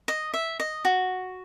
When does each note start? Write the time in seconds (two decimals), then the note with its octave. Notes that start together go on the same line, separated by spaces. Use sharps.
0.08 D#5
0.34 E5
0.60 D#5
0.85 F#4